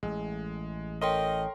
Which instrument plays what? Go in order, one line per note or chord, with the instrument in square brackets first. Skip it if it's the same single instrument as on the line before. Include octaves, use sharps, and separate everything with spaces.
[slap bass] A1 [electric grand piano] G#3
[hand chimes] A4 C#5 G5 [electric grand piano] A#4 C6 [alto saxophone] D#5